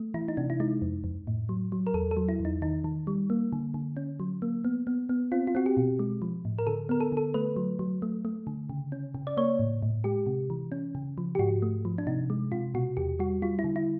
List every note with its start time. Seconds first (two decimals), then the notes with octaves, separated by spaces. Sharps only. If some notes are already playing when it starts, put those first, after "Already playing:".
Already playing: A3
0.14 E3 E4
0.28 D#4
0.37 C3 D4
0.50 E4
0.60 G#3 D#4
0.82 F2
1.04 F2
1.27 A2
1.49 F#3
1.72 F#3
1.87 A#4
1.94 E2 A4
2.11 A4
2.17 F#3
2.29 E4
2.39 E2
2.45 D#4
2.62 D#3 D#4
2.84 D#3
3.07 G3
3.30 A#3
3.52 D3
3.74 D3
3.97 C#4
4.20 F#3
4.42 A#3
4.65 B3
4.87 B3
5.09 B3
5.32 C4 F4
5.47 F4
5.55 C4 F#4
5.66 G4
5.77 B2
5.99 G#3
6.22 F3
6.45 A2
6.59 A#4
6.67 D3 A4
6.89 B3 A#4
7.00 A4
7.12 D3 A4
7.34 A3 B4
7.56 F#3
7.79 F#3
8.02 A3
8.25 A3
8.47 D3
8.69 C#3
8.92 C#4
9.15 C#3
9.27 D5
9.37 A#3 C#5
9.59 A2
9.82 A2
10.04 G#3 G4
10.26 C3
10.50 E3
10.72 C#4
10.95 C#3
11.18 F3
11.35 G4
11.39 G#2 F#4
11.62 A3
11.85 F3
11.98 D4
12.07 C3 D#4
12.30 G#3
12.52 C3 F4
12.74 B2 F#4
12.97 E2 G4
13.19 G3 F#4
13.42 G3 F4
13.59 E4
13.64 D3
13.76 E4